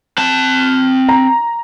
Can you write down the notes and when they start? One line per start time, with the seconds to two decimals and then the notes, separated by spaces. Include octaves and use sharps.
0.18 C4 A5
1.09 A#5